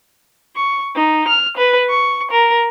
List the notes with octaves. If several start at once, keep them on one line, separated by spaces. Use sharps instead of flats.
C#6
D#4
F6
B4
C#6
A#4